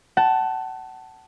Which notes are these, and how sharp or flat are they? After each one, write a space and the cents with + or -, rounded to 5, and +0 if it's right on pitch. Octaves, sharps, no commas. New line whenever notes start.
F#5 +35 A5 +0